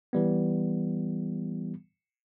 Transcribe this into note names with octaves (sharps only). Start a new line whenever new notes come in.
E3 G3 B3